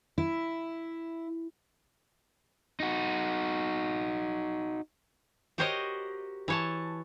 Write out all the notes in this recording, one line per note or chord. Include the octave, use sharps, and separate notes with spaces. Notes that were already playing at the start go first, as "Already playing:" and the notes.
E4
D#4 F#4
F#4 G4 A#4 C5 C#5 D#5
E3 C#5 A5